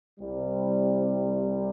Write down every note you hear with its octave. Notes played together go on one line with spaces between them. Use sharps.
C2 C3 G3